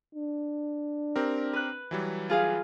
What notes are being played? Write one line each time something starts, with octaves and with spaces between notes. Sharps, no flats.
D4
C4 G4 A#4
B4 F#6
E3 F#3 G3
F4 G#4 F5